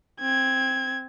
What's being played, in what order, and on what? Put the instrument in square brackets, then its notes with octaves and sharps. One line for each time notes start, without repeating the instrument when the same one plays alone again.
[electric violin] C4 G#6